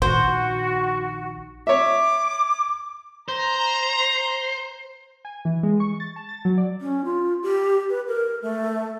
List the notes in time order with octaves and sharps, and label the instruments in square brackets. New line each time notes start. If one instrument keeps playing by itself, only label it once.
[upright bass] A#1 D#3 [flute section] F#4 [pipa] C5
[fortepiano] C#5 E5 [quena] D6
[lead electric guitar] C5 [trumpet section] A#5
[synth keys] G#5
E3
G#3
C#6
A6
A5
A6
F#3
D5
[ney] C#4
F4
G4
B4
A#4
A3